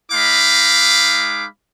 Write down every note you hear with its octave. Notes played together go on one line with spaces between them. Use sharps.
G#3 D#4 F5 B5 D6